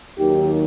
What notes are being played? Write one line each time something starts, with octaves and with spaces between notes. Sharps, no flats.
D#2 D#3 F#3 G4